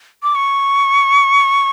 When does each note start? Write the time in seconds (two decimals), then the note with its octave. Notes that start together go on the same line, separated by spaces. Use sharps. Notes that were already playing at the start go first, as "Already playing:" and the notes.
0.23 D6
0.35 C#6